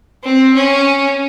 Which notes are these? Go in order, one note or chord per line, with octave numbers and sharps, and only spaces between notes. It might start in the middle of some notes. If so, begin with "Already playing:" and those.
C4
C#4